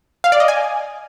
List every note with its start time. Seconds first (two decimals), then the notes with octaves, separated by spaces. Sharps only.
0.24 F5
0.32 D5
0.40 D#5
0.48 G#5